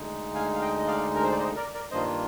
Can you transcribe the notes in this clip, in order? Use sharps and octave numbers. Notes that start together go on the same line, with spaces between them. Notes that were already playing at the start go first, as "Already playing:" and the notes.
Already playing: D2 D3 G#3 D#4
F5 G#5
F5
D#5 G5
D#5
D5 F5
A#4
C5
D5
C5 D#5
A#4 D5
A#4 D5
G2 D#3 A#3 D4 F4 C5 D#5